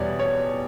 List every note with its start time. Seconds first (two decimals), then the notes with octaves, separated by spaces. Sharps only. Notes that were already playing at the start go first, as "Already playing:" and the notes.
Already playing: E2 B2 G3 C#5 D5
0.19 C#5